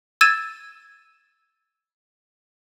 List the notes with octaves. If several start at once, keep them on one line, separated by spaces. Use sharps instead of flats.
E6 G#6 A6 D#7 E7